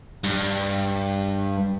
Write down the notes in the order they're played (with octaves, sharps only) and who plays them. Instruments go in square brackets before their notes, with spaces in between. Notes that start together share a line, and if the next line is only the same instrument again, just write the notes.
[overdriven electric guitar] G2